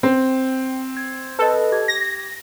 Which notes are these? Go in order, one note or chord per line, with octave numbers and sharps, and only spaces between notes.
C4 G5
G#6
A4 B4 D#5
G4 G#6
A#6